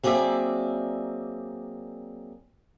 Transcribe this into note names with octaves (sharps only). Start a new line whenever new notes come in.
F#3 A#3 C4 G#4 D5 E5